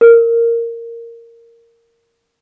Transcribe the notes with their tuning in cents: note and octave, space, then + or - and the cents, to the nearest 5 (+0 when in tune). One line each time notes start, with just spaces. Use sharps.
A#4 -10